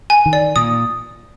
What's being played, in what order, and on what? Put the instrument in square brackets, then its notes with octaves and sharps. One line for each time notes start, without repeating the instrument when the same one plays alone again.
[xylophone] G#5
[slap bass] D#3
[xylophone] D5
[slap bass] A#2 [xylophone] D#6